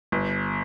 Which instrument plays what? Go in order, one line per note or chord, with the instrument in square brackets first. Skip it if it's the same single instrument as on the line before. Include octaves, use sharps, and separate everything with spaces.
[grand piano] G1